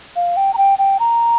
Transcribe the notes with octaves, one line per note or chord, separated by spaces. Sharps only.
F5
G5
A#5
G5
G5
A#5